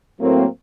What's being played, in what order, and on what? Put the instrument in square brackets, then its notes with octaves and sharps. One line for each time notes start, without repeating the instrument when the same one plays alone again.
[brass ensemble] A2 F#3 A#3 C4